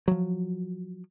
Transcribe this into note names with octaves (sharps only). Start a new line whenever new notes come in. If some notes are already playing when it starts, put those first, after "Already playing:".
F3 F#3